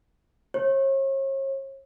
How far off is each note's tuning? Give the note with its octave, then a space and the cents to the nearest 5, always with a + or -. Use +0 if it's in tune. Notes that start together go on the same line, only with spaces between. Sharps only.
C#5 -40